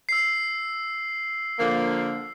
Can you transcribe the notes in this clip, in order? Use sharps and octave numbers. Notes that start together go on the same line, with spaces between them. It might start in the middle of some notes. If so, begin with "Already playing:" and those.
E6 C7
D3 F3 A#3